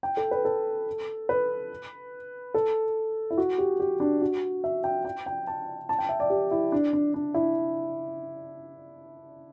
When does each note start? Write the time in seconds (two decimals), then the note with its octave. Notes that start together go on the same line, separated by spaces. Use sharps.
0.03 G5
0.17 A4
0.31 B4
0.45 A4
1.29 B4
2.54 A4
3.30 E4
3.38 F#4
3.58 G4
3.80 G4
4.00 D4
4.21 F#4
4.64 E5
4.84 G5
5.05 G5
5.26 G5
5.47 A5
5.89 A5
5.98 G5
6.09 E5
6.20 D5
6.30 G4
6.51 E4
6.72 D4
6.93 D4
7.14 D4
7.34 E4